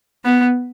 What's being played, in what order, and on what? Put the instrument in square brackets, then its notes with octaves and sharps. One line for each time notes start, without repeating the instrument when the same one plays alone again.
[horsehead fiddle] B3